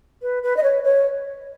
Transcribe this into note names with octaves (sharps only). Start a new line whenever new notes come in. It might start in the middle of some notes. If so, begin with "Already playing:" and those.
B4
B4
D#5
C#5
C#5